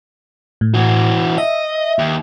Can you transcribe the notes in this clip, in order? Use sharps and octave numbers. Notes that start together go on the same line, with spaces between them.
A2
E3 F#4
D#5 E5
D#2